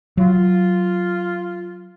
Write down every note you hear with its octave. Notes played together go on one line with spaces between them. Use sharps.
F#3 F4